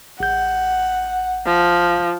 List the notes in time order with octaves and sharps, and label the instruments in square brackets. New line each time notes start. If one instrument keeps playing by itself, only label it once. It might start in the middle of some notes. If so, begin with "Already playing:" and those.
[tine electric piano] A1 G6 [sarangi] F#5
[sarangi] F3